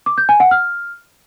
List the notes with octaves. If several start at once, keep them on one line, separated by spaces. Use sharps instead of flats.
D6
G6
G#5
F#5
F6